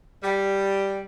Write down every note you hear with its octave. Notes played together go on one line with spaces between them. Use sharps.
G3